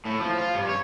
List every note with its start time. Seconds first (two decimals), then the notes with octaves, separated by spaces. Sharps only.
0.05 A2
0.20 F3
0.38 F4
0.55 G2
0.69 C#5